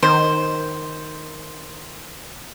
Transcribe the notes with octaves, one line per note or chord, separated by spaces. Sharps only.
D#3 C5